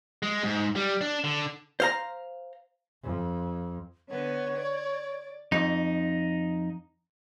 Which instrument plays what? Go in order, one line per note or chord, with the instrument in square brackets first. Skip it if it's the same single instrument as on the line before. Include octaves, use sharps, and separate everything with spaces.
[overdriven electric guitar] G#3
G#2
G3
D4
D3
[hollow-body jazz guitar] C5 F5 A#5
[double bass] F2
[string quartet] D3 B3 [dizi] C#5
[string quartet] D5
[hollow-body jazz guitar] F2 [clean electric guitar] D#4